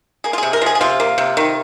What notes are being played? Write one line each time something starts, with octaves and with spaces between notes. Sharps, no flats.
A#3 G#4
F4
C3 G#4
A#4
F3 G#4
G#4
C3 F4
A#3
C3
D#3